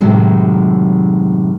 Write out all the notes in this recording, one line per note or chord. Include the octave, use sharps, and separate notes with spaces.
F#2 A2 C3 D#3 F#3 G#3